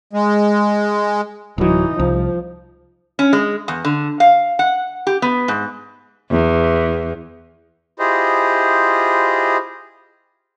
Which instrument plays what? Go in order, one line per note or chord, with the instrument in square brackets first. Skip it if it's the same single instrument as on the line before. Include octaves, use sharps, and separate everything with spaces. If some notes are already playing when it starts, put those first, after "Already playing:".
[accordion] G#3
[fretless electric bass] D1 F#3 [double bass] E3 D#4
[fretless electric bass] C2 [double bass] F3
[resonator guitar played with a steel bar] C#4
G#3
E2
D3
F5
F#5
G4
B3
G#2
[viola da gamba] E2
[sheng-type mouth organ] E4 F4 G4 G#4 C5 D#5